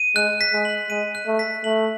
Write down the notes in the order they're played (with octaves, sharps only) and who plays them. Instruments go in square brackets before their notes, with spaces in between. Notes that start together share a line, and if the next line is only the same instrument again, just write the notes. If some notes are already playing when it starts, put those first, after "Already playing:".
Already playing: [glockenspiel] D#7
[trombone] G#3 [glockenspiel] F#6
[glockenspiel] B6
[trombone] G#3
[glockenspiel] F#7
[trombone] G#3 [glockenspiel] D#7
[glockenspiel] F#6
[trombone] A3
[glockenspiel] B6
[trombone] A3 [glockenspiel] F#7